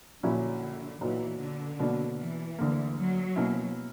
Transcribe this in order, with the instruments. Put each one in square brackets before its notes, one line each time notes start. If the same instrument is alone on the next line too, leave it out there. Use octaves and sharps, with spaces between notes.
[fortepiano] A#1 A#2 F#3 C#4 E4 [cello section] D3
[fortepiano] B1 A#2 F#3 [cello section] E3
[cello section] D3
[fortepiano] B2 F#3 A#3 D4
[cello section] E3
[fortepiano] D2 D3 A#3
[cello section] F#3
[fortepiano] B2 A#3 C#4 E4